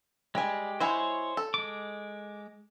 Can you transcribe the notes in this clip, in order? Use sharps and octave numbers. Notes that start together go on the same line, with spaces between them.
G3 G#3 G4 G#5
G#3 E4 F#4 C5 C#5
A4
G#3 D6